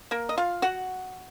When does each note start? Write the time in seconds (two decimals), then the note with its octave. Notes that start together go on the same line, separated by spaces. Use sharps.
0.11 A#3 A#4
0.29 D#5
0.38 F4 F5
0.62 F#4 F#5